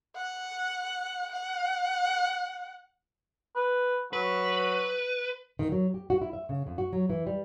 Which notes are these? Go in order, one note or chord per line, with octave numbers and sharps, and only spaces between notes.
F#5
F#5
B4
F#3 B4
D#3
F#3
G4
F#4
E4
E5
C#3
F2
F#4
F#3
E3
G3